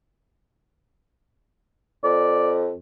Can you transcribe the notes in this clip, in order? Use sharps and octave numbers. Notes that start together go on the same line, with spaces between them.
F2 D5